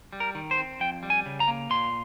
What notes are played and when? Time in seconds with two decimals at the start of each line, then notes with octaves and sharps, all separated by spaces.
0.13 G3
0.20 A#4
0.35 D#3
0.51 C5
0.58 C4
0.80 F2 G5
1.03 G3
1.10 G#5
1.26 C#3
1.40 A#5
1.48 A#3
1.70 A#2 C6